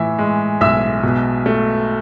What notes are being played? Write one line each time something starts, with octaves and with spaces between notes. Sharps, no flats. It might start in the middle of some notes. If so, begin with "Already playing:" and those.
Already playing: A2 E3 E5
G#3
B1 E5 E6
B2
A3